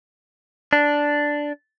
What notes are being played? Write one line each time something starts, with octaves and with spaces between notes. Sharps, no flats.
D4